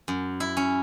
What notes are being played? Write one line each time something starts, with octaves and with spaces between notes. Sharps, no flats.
F#2
E4
C#4